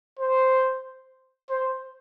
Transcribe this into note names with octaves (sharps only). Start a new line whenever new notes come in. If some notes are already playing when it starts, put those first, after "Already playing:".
C5
C5